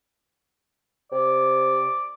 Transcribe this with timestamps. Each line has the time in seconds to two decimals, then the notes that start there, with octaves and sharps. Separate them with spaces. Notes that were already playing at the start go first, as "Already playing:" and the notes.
1.12 C3 D5